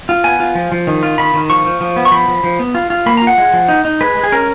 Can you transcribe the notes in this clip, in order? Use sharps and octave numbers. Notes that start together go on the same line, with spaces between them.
F4
B3 G#5
F4
F3
F3
D#3
F4
D#3 B5
D#3
F3 C#6
F3
F3
B3
C#6
F3 B5
F3
F3
B3
F4
F4
A#3 B5
A#5
F4
F#5
G#3
F3
D#4
D#4
G#3 B4
G#3
G#4
C#4 A#4